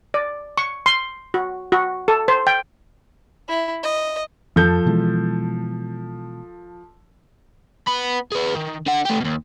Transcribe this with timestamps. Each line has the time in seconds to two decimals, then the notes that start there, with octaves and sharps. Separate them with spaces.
0.14 D5
0.57 C#6
0.86 C6
1.34 F#4
1.72 F#4
2.08 A4
2.28 C5
2.47 G5
3.48 E4
3.83 D#5
4.56 F2 F3 A4 G6
4.86 B2 E3 G#3
7.87 B3 B5
8.32 G#4 B4
8.55 D#3
8.86 D3 F#5
9.05 A3 G4
9.20 D#2 B2